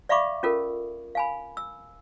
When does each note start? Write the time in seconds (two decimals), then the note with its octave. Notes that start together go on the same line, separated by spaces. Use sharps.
0.09 D5 E5 F5 B5 C#6 D6
0.43 C#4 F4 A4 A#4
1.15 F5 G#5 B5
1.57 E6